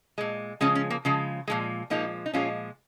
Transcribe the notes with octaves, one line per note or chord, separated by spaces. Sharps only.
A#2 G#3
C#3 F3 G#3 C#4
C#4
A#3
C#3 F3 G#3
A#2 F3 G#3
A#2 F3 G#3 A#3 D#4
D#4
A#2 F3 G#3 C#4 F4